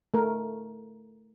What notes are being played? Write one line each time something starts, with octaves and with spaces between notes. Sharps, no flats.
A3 A#4